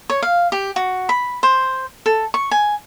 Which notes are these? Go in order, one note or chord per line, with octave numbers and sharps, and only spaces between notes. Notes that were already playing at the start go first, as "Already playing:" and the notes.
C#5
F5
G4
F#4
B5
C5
A4
C#6
G#5